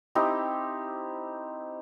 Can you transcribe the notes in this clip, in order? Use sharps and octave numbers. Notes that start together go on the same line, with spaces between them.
C4 D#4 E4 G4